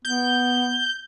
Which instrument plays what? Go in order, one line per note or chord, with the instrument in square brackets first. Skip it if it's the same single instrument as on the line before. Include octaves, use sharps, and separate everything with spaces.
[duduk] B3 [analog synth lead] G6